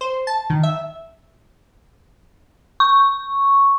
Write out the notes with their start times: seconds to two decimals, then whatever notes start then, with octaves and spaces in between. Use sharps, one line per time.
0.01 C5
0.27 A5
0.50 D#3
0.63 E5
2.80 C#6